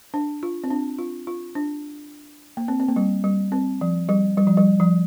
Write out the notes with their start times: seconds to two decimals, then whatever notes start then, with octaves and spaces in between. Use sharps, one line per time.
0.14 D4
0.43 F4
0.64 C4
0.71 D4
0.98 F4
1.27 F4
1.55 D4
2.57 A#3
2.68 C4
2.80 C4
2.88 A#3
2.96 G3
3.24 G3
3.52 C4
3.81 F3
4.09 G3
4.38 G3
4.47 F3
4.57 G3
4.80 F3